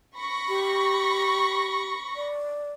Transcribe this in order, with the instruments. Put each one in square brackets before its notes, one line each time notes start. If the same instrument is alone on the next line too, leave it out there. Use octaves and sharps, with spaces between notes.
[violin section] B5 C#6 A#6
[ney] G4
D5